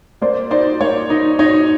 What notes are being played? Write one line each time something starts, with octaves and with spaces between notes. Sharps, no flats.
A#3 C5 D5
D#4 C5 D5
A#3 C#5
D#4
D#4 C#5